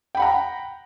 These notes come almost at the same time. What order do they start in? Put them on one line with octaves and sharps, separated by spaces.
G5 B5 F#5 A#5